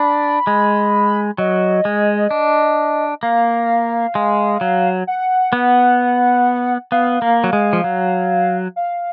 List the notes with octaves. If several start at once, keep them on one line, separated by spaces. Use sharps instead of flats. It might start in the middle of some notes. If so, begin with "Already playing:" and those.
Already playing: D4 B5
G#3
F#3 D#5
G#3
D4
A#3 F5
G#3
F#3
F#5
B3
B3 F5
A#3
F#3
G#3
F3
F#3
F5